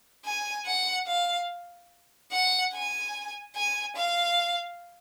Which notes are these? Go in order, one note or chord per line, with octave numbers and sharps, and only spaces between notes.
G#5
F#5
F5
F#5
G#5
G#5
F5